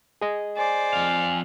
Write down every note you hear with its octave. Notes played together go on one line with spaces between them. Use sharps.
G#4 D#5
C5 D5 G#5
F2 F5